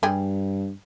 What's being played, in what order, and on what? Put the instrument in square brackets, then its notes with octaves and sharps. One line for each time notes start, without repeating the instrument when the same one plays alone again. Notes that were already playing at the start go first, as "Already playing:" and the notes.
[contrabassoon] G2 [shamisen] G3 G#4 G5